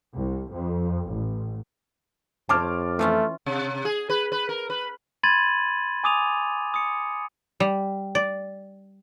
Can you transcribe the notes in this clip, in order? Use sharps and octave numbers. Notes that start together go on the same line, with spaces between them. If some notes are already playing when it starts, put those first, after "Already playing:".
C2
F2
A1
F2 C5 C#5 A5 D6 F6
E3 A3 C#4 F4
C3
G#4
B4
B4
A#4
B4
B5 C6 G#6 A6 D#7 F#7
G#5 D6 D#6 D#7 F7
D#6 C#7
G3
D5